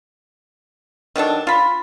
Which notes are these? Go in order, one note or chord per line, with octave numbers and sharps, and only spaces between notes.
D#3 F#3 D4 A4
F4 B5